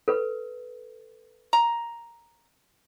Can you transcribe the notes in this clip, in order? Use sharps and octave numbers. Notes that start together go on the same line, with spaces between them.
A4 B4
A#5